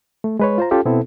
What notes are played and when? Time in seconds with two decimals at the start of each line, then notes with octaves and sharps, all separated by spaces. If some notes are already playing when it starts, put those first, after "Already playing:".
0.24 A3
0.39 G#3 B4 C#5
0.58 F4 C5 A#5
0.71 C#4 F4 G4 A4
0.85 B2 B3 C4 E4 A4